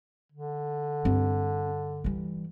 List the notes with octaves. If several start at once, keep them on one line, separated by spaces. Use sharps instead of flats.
D3
G2 C4
E3 G3